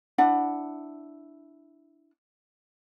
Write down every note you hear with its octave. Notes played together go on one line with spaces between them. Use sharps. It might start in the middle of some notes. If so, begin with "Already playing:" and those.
D4 E4 F#5